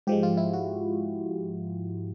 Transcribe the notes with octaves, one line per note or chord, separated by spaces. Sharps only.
G#2 F3 G#3 G4
F4
E4
F#4